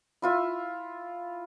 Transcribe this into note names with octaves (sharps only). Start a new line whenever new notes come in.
E4 F4 E5